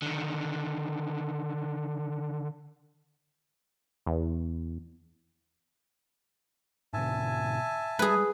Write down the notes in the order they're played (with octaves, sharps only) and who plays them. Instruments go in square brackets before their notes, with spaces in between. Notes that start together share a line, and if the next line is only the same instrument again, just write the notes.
[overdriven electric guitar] D3 D#3
[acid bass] E2
[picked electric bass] G#2 B2 D3 [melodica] E5 G#5 A5
[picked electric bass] G3 G#3 [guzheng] G#4 B4